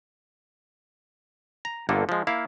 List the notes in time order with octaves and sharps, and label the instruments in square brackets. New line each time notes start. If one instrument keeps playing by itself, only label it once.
[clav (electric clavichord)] A#5
G1 G2 D3 A#3 A4
F3 G#3
A#3 E4 F5